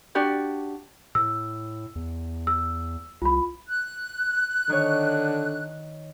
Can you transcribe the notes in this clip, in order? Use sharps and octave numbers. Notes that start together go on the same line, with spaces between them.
D4 F#4 G4 D5
A2 E6
E2
E6
C2 F4 B5
F#6
D3 D#3 C#5